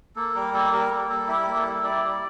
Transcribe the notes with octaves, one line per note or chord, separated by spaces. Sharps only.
A#3 A4
G3 A#4
A#3 A4
G3 A#4
A#3 A4
G3 A4
E4 G4
A#3
A4
G3
E4 D5
G3